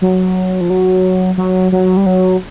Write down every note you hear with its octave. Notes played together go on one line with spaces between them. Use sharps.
F#3
F3
F#3
F#3
F#3
G3
F#3